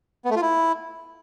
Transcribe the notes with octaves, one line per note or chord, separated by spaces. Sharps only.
B3
A3
F4
E4